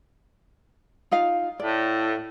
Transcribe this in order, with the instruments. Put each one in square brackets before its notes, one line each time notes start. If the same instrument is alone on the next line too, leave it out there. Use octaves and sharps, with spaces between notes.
[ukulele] D#4 F4 F5
[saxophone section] A2 [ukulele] D5